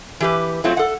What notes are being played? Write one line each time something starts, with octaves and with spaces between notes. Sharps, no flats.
E3 G4 B4
F#3 A3 C4 F4 F#4
A4 F#5